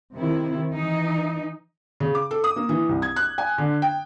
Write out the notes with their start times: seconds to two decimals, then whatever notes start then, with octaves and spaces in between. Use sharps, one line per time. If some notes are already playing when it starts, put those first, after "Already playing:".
0.13 C3 D#3 E4
0.71 E3 D#4
2.00 C#3
2.15 D6
2.31 A4
2.44 D#6
2.56 A#3
2.69 E3
2.89 C2
3.02 G#6
3.16 F#6
3.38 G#5
3.58 D3
3.82 G5